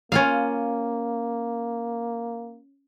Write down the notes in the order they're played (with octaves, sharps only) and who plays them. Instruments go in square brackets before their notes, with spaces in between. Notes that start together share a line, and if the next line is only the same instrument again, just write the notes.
[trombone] A#3 [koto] C#4 F4 F5